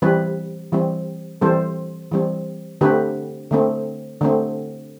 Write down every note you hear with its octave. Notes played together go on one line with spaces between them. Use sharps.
E3 G3 C4 G4 B4
E3 G3 C4
E3 G3 C4 A4 C5
E3 G3 C4
D3 A3 C4 G4 B4
D3 A3 C4
D3 A3 C4